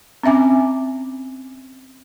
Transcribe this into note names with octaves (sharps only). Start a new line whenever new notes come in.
C4 C#4 E5 G#5 D6